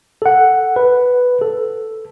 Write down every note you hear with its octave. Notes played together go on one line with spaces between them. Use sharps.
A4 F#5
B4
A4